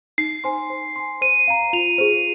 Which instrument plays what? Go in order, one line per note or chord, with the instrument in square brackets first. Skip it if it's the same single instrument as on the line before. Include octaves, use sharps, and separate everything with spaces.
[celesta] D#4 [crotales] C7
[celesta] C5 G#5 C6
C5
G#5 C6
[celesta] C5 [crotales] D#7
[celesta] F5 A#5
[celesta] F4 [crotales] F7
[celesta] G#4 C5